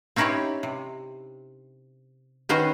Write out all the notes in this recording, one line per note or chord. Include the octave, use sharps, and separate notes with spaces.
C4 C#4 D#4 E4 G4 C#5
C3
D#3 B3 C#4 C5 C#5 D#5